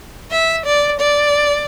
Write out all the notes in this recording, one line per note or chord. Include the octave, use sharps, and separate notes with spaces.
E5
D5
D5